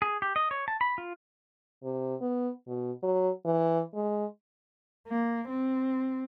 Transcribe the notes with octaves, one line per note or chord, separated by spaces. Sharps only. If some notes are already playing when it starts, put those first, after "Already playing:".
G#4
G4
D#5
C#5
A5
B5
F4
C3
B3
B2
F#3
E3
G#3
A#3
C4